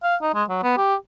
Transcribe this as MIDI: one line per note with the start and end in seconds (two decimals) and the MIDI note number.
0.03 0.16 77
0.22 0.32 63
0.35 0.43 56
0.49 0.61 54
0.63 0.75 59
0.77 0.95 67